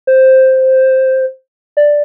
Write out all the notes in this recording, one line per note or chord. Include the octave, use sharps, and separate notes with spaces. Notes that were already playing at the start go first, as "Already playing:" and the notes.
C5
D5